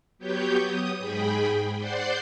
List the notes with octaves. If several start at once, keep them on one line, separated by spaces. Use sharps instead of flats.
F#3 B3 G4 C#5 G6
D#6
G#2 G#4 G5 B5
C5 D5 F#5 C6 G6